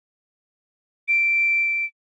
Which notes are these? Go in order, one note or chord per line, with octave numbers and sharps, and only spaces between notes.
D7